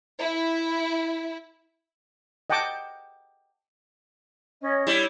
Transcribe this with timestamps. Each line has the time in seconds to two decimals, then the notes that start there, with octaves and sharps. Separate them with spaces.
0.20 E4
2.50 D#5 F#5 G5 A5 D6
4.62 C#4 C#5 D#5
4.87 G3 E4 C#5